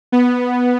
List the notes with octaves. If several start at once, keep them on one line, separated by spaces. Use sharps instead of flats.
B3